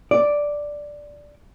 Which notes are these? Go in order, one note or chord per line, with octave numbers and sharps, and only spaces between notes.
D5